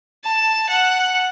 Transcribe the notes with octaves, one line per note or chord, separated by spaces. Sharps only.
A5
F#5